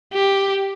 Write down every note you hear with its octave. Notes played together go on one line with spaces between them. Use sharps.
G4